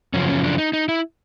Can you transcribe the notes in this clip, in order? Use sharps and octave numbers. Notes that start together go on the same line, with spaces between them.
F#2 C#3 F3 C#4
C#4
D4
D#4
D#4
E4